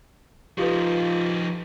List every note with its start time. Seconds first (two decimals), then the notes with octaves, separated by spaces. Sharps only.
0.58 F3 D#4 F4 G4 A4 B4